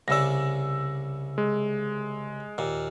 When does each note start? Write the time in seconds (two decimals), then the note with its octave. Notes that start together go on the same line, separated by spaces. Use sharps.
0.08 C2 C#3 D5 E6 A#6
1.38 G#3
2.58 D#2 A#2